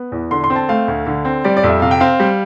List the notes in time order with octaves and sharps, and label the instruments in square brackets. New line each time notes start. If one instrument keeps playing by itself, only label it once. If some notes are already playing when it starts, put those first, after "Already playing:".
Already playing: [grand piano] B3
E2
D3 C6
C6
C4
A5
A3 F5
D2
D3
C4
G3 D5
D5
F2
E5
C3 F5
G5
C4 F5
G3